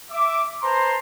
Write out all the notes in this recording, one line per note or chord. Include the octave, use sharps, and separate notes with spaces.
E5 D6
B4 C5 A5 A#5 C6